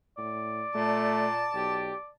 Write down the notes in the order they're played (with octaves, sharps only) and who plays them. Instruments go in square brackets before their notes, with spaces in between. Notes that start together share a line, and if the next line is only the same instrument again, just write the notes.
[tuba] A2 [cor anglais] D5
[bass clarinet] A#2 [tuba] A3 [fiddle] A5
[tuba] B1 [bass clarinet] G4